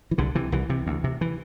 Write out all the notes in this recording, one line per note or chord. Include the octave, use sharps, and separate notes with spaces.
E3
C2 D3
C3 E3
C2 E3
C3
D2
C3
E3